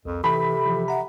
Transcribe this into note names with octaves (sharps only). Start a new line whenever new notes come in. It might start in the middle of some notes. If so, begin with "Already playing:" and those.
C2 F2
C3 E3 A4 B5
E3 F3
E5 F#5 A#5